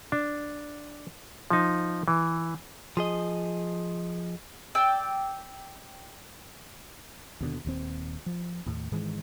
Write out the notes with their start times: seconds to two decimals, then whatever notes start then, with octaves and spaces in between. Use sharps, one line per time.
0.12 D4
1.50 F3 D#4
2.08 E3
2.97 F3 G#4 D#5
4.75 D5 G5 E6
7.40 D#2 B2 D3
7.64 D#1 D#2 E3 C4
8.26 F3
8.66 D#2 A2
8.92 G#2 D#3 E3 G#3